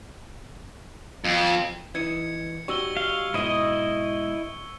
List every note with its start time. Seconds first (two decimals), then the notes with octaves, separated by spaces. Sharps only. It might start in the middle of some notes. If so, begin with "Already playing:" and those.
1.24 F2
1.95 E3 D#4 G#6 C#7
2.68 G3 D#4 F#4 C#6 E6 G7
2.97 F5
3.34 G#2 B2 E4 F#4 D#5